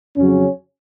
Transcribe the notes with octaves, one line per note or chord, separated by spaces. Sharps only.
F2 C#3 F#3 C#4